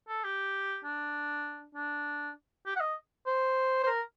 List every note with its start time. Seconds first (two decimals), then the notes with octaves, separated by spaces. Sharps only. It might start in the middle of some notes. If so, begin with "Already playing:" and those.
0.08 A4
0.24 G4
0.84 D4
1.75 D4
2.67 G4
2.76 F#5
2.81 D#5
3.26 C5
3.84 C5
3.87 A#4